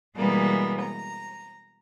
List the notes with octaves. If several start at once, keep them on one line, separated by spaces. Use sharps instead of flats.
B2 E3 G3 G#3 A#3 B3
A#5